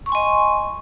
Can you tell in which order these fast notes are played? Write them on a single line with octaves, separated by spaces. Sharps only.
C#6 C6 G#5 D#5